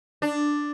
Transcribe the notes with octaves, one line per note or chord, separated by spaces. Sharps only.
D4